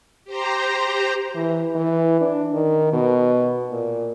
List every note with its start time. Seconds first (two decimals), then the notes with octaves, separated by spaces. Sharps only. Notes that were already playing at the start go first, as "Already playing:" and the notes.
0.24 G4 C5 A#5
1.35 E3
1.75 E3
2.21 D4
2.53 D#3
2.92 B2
3.70 A#2